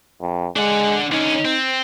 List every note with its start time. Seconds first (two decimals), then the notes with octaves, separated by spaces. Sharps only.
0.22 F2
0.56 G#3 D4 F#5
1.12 D3 C#4 D#4
1.45 C4